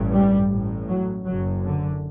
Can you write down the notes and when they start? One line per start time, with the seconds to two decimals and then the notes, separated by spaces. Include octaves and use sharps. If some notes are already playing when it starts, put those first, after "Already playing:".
Already playing: A1 G2
0.13 G3
0.50 A1 A2
0.88 F#3
1.25 F#1 F#2 F#3
1.63 D3